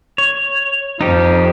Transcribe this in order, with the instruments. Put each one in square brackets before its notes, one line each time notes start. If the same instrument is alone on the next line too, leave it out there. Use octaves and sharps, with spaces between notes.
[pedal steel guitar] C#5
[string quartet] F2 F3 [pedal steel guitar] D#4 G4